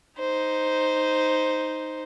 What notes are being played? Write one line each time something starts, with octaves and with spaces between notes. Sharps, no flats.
D#4 C5